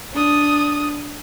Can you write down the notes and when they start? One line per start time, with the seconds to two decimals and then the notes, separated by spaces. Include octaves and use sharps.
0.13 D4 D#6